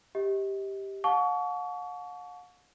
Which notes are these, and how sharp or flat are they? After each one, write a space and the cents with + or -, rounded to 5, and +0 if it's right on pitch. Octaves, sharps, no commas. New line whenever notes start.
G4 +0 D#5 +35
F#5 -45 A5 -25 C#6 +35